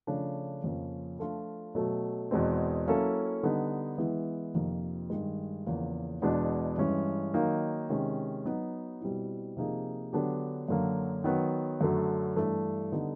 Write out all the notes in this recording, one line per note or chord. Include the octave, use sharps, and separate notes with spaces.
C#3 F3 A3 D4
F2 C#3 F3 A#3 C#4
F3 A3 D4 F4
B2 F#3 A3
E2 B2 G#3 C4
F#3 A#3 C#4 E4 A4
D3 G3 B3 D#4
E3 G#3 B3 E4
F2 C3 F3 A#3 D#4
G2 D#3 G#3
E2 C#3 F3 A#3
E2 B2 G#3 B3 D4
G2 E3 G#3 C#4
D#3 F#3 A#3 D#4
C3 D#3 G#3 C#4
F#3 B3 D#4 F#4
B2 G3 C4 E4
C3 F3 A#3 D#4 G#4
D3 F#3 B3 D4 G4
F#2 D3 F#3 A#3
D#3 F#3 B3
F#2 D3 F#3 A3
G2 E3 A3 D4
D3 G3 B3 D#4